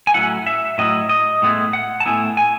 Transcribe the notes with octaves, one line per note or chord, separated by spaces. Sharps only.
G#5
A2 F#3 C#4 E4 F#5
E5
A2 F#3 C#4 E4 D#5
D#5
A2 G#3 B3 E4
F#5
A5
A2 G#3 B3 E4 G#5
G#5